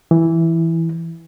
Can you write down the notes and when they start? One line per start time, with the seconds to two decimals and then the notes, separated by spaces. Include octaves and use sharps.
0.11 E3